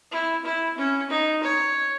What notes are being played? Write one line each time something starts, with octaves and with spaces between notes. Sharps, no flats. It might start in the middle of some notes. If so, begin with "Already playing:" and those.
E4
E4
C#4
D#4
C#5